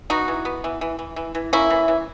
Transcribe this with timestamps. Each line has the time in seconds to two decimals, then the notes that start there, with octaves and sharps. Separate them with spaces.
0.10 B3 D#4 F#4
0.28 E3
0.45 B3
0.64 E3
0.81 E3
0.99 E3
1.16 E3
1.35 E3
1.53 A#3 C#4 E4
1.70 E3
1.88 E3